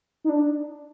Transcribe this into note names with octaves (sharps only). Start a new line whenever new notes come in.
D#4
D4